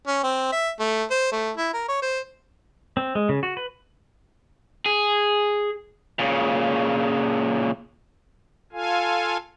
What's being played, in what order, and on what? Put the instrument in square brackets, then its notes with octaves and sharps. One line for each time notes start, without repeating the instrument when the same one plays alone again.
[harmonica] C#4
C4
E5
A3
C5
A3
E4
A#4
C#5
C5
[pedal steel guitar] C4
G#3
C#3
F#4
B4
[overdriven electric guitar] G#4
[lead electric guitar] A#2 C#3
[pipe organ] F4 A4 F5 G#5